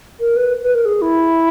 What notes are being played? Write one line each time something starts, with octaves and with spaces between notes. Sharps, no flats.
A#4
B4
B4
A#4
G#4
E4